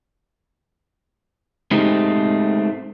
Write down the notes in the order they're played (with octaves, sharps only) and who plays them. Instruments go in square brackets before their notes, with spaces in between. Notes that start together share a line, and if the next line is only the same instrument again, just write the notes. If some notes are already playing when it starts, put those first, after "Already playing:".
[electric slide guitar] G#3 A3 C4 D#4 G4